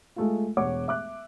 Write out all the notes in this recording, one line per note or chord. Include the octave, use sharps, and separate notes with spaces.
G#3 A3 F4
E1 C#5 F#5 D6
E5 D6 F#6